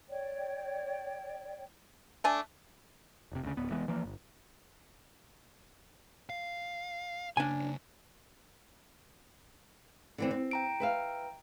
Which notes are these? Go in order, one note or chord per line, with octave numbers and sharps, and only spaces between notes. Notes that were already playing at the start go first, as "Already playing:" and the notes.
C#5 D5 G5
A3 D4 G#5
F1 C3
D2 C#3
D1 B3
F1 E3 G#3 B3
E3 F3 A#3
G1
F5
C#3 A#3 D4 G#5
D3 E3 C4
C4
G5 A#5 D7
B4 E5 F5